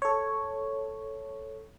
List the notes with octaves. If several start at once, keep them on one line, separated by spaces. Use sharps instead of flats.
A4 C#5